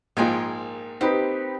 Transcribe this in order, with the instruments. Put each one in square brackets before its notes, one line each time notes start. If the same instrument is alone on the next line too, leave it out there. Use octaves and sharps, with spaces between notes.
[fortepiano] A#1 G#2 F3 [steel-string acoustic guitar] A#3 A#4 G5 [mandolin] G#5
[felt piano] C4 D#4 B4 [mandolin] G4